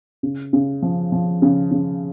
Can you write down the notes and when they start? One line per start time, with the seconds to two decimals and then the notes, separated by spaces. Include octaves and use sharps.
0.23 C#3
0.53 C#3
0.82 F3
1.12 F3
1.42 C#3
1.71 C#3